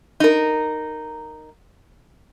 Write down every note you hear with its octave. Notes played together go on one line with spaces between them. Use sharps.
D#4 A#4